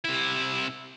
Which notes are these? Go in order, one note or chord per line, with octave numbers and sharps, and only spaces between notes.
C3 E4